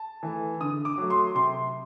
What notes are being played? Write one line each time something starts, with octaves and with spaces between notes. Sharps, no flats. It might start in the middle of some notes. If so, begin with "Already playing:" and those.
Already playing: A5
E3 A3
D3 D#6
D6
F#3 A3
C6
C3 C6